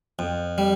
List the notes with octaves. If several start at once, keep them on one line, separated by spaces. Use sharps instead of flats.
F2
G3